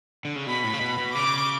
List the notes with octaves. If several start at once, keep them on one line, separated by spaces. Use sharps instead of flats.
D3
C#3
B2 B5
A2
C#3
B2
B2
C#3 D6